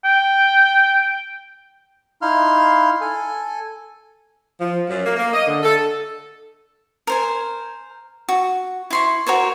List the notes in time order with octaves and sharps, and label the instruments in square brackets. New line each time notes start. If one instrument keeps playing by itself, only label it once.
[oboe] G5
[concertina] D#4 E4 F5 C6 F6
A4 G#5
[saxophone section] F3
F#2
A#3
A#3
D#5
D3
A4
[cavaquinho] A#4 C5 G#5
F#4
E4 C6 C#6
F#4 A#4 C5 C#5